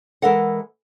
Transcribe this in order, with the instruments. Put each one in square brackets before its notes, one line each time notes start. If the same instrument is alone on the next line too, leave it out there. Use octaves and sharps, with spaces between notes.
[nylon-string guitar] E3 G#3 A4 A#4 F#5